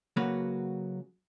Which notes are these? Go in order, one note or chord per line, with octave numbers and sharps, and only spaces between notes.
C#3 F#3 A#3 F#4 B4